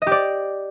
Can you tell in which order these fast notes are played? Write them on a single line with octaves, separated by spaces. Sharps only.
D#5 G4 D5